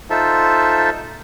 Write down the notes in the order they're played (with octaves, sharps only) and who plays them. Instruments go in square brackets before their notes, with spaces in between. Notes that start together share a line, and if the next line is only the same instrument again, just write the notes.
[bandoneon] D#4 F4 A4 C5 E5 A5